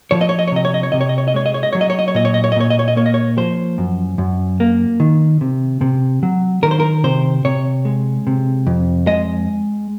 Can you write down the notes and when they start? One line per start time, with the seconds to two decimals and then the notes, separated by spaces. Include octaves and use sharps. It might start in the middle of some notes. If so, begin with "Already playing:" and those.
0.11 F3 C#5
0.21 D#5
0.29 C#5
0.39 D#5
0.48 C#5
0.52 C3 D#5
0.65 C#5
0.74 D#5
0.83 C#5
0.92 C3 D#5
1.01 C#5
1.09 D#5
1.18 C#5
1.28 D#5
1.34 G#3 C#5
1.46 D#5
1.54 C#5
1.63 D#5
1.73 F#3 C#5
1.81 D#5
1.90 C#5
1.99 D#5
2.08 C#5
2.15 A#2 D#5
2.25 C#5
2.34 D#5
2.44 C#5
2.52 D#5
2.56 A#2 C#5
2.70 D#5
2.79 C#5
2.88 D#5
2.96 A#3 C#5
3.06 D#5
3.14 C#5
3.38 F3 C5
3.78 F#2
4.18 F#2
4.60 A#3
5.00 D#3
5.41 C3
5.81 C3
6.23 F#3
6.63 D#3 A#4
6.71 C5
6.80 A#4
7.04 C3 C5
7.45 C3 C#5
7.85 G#3
8.27 C3
8.67 F2
9.07 G#3 D#5